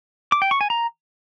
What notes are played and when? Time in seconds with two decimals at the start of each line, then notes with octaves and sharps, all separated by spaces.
0.32 D6
0.42 G5
0.51 C#6
0.61 G#5
0.70 A#5